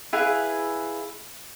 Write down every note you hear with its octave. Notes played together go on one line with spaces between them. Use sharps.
E4 G#4 B4 F5